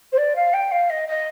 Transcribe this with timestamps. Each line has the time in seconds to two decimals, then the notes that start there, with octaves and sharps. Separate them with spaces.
0.12 C5
0.17 D5
0.35 F5
0.53 G5
0.71 F5
0.89 D#5
1.07 D#5